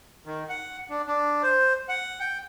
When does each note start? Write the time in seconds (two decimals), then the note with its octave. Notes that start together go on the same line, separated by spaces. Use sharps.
0.26 D#3
0.49 F#5
0.90 D4
1.07 D4
1.43 C5
1.89 F#5
2.20 G5